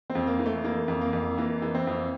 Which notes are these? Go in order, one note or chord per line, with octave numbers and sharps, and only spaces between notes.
C4
F2
A#3
E3
A3
E3 A#3
F2
A#3
F2
E3 A#3
E3
C4
F2